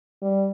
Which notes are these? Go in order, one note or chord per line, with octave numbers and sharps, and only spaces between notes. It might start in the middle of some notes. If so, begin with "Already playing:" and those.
G3